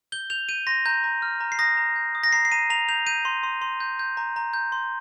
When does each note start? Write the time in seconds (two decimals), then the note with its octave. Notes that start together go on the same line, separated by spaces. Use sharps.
0.12 G6 G7
0.30 G6 F7
0.49 G6 D#7
0.67 C6 A#6
0.86 A#5 G6
1.04 A#5
1.22 F6
1.40 A#5
1.52 C7
1.59 D#6 A#6
1.77 A#5
1.96 G6
2.15 D#6
2.24 A#6
2.33 A#5 C7
2.45 C7
2.52 A#5 D#7
2.70 A#5 F7
2.89 G6 F7
3.07 G6 D#7
3.25 C6
3.43 C6
3.62 C6
3.80 G6
3.99 G6
4.17 A#5
4.36 A#5
4.53 G6
4.72 C6